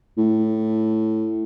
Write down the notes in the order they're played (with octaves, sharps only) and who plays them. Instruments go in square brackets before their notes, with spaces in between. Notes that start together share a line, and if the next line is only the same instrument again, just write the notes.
[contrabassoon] A2